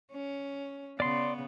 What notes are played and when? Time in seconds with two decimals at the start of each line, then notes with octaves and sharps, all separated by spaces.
0.12 C#4
1.00 C#3 B3 D5 C6